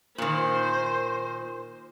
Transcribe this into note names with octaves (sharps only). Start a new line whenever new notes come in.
A#2 D#3 C5